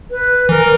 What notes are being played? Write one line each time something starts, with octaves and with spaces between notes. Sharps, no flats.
B4
E3 A#4